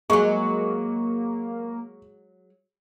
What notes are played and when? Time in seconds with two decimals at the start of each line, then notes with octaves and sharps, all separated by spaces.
0.10 F#3 G#3 A#3 C#6